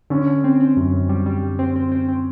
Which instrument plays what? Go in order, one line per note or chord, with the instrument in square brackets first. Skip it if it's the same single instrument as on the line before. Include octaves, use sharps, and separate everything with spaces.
[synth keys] D3 [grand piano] C#4
[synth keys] D3
C4
C4
F#2
F#2
G3
G3
G3
C4
C4
C4
C4